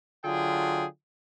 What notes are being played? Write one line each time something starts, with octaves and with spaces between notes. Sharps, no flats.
D3 F#3 F4 G#4 G5